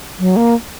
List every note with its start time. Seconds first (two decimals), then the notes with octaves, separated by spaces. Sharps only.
0.19 F#3
0.36 A#3